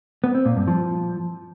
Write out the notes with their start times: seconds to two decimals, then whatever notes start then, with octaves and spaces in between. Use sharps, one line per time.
0.24 B3
0.35 C4
0.46 A#2
0.57 G2
0.68 F3